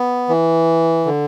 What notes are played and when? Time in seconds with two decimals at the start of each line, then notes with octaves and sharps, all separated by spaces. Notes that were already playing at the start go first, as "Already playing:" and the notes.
Already playing: B3
0.29 E3
1.06 D3